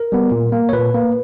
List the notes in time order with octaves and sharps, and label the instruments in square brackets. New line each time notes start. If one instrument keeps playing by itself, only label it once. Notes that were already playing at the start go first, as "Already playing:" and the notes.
Already playing: [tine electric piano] A#4
G3 B3
A#2
A#3
C#5
A#2 B4
A#3